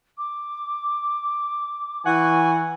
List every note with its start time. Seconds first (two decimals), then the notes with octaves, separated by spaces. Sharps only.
0.17 D6
2.06 E3 F#5 G#5 C#6